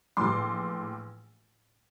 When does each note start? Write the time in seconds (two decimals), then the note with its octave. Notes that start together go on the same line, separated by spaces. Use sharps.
0.17 A#1 A2 E3 C6 D6